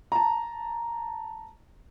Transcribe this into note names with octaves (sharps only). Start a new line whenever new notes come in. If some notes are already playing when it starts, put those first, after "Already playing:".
A5 A#5